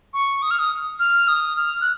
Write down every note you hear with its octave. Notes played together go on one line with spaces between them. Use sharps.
C#6
D#6
F6
D#6
F6
D#6
F6
F#6